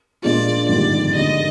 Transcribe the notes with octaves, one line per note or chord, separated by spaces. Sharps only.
A#2 G#3 D4 F4 D5
G#1 G2 D3 G3 D5
D#2 D3 G#3 D#4 D#5